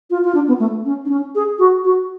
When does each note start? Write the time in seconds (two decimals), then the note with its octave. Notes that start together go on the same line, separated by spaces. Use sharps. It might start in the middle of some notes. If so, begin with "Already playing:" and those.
0.10 F4
0.24 F4
0.35 D4
0.48 B3
0.59 A3
0.85 C#4
1.05 D4
1.09 C#4
1.35 G#4
1.59 F#4
1.84 F#4